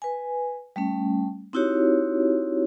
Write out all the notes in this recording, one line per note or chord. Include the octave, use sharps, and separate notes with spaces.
B4 G#5
G3 A3 C#4
C4 D#4 E4 F#4 G4 C#5